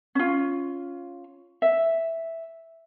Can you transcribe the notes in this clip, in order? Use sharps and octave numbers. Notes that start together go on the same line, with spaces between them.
C#4 F4
E5